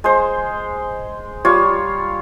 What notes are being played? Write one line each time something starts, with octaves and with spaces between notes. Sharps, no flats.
G#3 C5
G3 F4 C#5